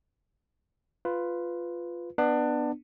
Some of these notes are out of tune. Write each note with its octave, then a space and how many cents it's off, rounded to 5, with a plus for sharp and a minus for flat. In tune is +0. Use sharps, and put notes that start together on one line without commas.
F4 +0 B4 +10
B3 +0 D4 +20